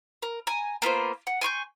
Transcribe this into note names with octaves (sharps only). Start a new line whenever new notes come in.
A#4
G#5 A#5
A#3 B3 F4 C5
F#5
G#5 C6 C#6 G6